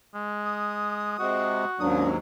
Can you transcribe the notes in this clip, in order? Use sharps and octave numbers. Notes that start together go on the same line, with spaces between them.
G#3
D#6
C3 G#3 F#4
D#2 G#2 F#3 A#3 C#4 D4 D#6